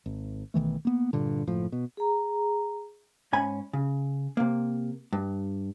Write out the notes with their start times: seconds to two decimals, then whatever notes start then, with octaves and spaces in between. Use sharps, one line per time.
0.06 G#1
0.54 B1 D#3 E3 A3
0.85 A#3 B3
1.13 G2 A#2 D3
1.47 F#1 A2 F3
1.72 B2
1.97 G#4 A#5
3.33 G#2 C#4 G#5 B5
3.73 C#3
4.37 C3 A#3
5.12 G2